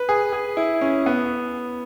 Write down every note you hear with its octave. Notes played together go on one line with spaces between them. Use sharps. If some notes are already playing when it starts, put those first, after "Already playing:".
Already playing: B4
G#4
G#4
E4
C#4
B3